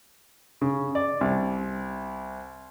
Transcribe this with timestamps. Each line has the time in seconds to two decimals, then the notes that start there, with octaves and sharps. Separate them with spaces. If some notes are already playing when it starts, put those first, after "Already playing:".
0.61 C#3
0.95 D5
1.21 C2